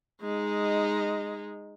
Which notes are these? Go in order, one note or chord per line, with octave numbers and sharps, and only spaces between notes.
G#3 D#4